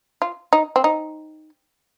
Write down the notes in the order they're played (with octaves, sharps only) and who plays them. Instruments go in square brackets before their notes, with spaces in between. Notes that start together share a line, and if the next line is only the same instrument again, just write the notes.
[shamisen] F4
D#4
C4
D#4